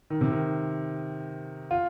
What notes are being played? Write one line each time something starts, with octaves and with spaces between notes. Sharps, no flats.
D#3
C3
D#3
F4